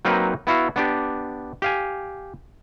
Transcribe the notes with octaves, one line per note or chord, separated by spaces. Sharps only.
F#3 A#3 C4 D#4 A#4 B4
B3 E4 F#4 F5
B3 D4 G4
G4 F5 G#5